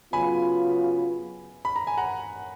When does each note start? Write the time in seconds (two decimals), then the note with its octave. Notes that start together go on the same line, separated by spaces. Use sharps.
0.13 C#3 F#3 B3 F4 G#5 B5
1.65 B5
1.76 A#5
1.87 G#5
1.97 F#5 A#5